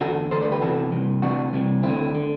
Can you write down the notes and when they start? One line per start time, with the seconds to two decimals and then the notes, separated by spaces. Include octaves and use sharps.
0.01 E2 D3 F#4 A4
0.31 D3 A4 C5
0.36 D2
0.41 B4 D5
0.52 G4 B4
0.61 E2 C3 E3 F#4 A4
0.92 C2 C3 E3
1.22 D2 C3 E3 D4 F#4
1.53 C2 C3 E3
1.83 D2 D3 C4 E4
2.15 D3